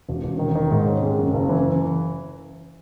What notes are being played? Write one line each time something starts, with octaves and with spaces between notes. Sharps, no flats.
E1
E1
D#3
D#3
G#2
C#4
G#3
F#2
F#1
E3